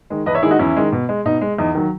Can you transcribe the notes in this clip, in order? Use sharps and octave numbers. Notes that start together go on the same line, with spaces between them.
D#3 G#3
E2 B4 D#5
C#5 E5
D#3 G#3 E4 G#4
D#4 F#4
E2 C#4 E4
D#3 G#3
B2
G#3
B2 D#4
G#3
E2 D#4
D#3 F#3